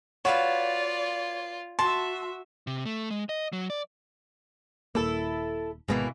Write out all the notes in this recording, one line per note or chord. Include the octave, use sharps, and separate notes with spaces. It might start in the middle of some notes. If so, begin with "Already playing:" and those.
F4 F#4 B4 C#5 D5 F5
F#4 E5 A5 C6
C3
A3
G#3
D#5
F#3
D5
D#1 A#3 E4 A4
G#1 B2 E3 G#3 A#3 B3